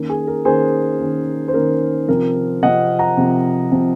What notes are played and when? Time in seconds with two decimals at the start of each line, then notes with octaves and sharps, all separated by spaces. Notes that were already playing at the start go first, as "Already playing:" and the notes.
Already playing: D#3 A#3 C#4
0.09 G#4
0.27 A#4
0.45 D#3 A#3 C#4 G#4 C5
1.00 D#3 A#3 C#4
1.48 C5
1.54 D#3 A#3 C#4 A#4
2.08 C3 F3 C4 A#4
2.63 C3 F3 C4 D#5 F#5
2.99 F#5 A#5
3.17 C3 F3 C4
3.72 C3 F3 C4